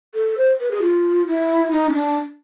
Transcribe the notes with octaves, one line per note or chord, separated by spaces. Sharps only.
A4
C5
B4
G#4
F4
E4
D#4
C#4
D4